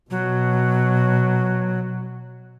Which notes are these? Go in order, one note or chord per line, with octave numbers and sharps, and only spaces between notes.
B2 F#3